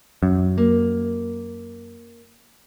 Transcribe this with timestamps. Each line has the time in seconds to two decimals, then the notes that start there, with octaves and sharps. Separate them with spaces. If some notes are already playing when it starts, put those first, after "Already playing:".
0.23 F#2
0.58 A#3